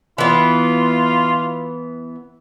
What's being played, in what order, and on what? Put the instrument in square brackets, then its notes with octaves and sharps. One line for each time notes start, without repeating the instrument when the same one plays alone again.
[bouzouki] E3 B3 [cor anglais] F4